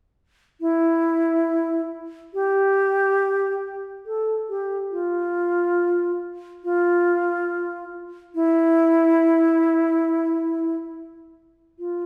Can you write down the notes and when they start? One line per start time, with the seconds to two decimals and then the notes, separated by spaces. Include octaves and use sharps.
0.61 E4
2.34 G4
4.06 A4
4.49 G4
4.91 F4
6.64 F4
8.35 E4
11.79 F4